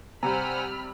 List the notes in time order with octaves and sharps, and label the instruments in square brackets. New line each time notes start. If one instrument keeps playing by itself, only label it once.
[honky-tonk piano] C3 G3 [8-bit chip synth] C5 F#5 G#5 [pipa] A#5 [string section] B5 F6